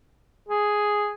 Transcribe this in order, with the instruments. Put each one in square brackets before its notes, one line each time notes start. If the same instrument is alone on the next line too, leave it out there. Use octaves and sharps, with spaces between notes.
[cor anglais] G#4